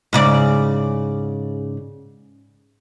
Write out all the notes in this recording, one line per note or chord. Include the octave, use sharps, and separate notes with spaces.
G#2 C#3 D5